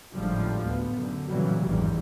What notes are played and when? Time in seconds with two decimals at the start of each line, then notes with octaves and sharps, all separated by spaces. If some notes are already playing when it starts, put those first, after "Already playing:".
0.13 G#1 A2 D3 F3 G3
0.63 D2 B3
0.93 F#2 D3
1.27 A#2 C#3 E3 F#3 G3
1.64 G#1 E2 G2 D#3 E3 G3